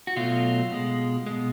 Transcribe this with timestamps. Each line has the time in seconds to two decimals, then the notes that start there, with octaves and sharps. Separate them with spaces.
0.07 F#4
0.16 B2 F#3 A3 F4
0.72 B2 G#3
1.26 B2 G#3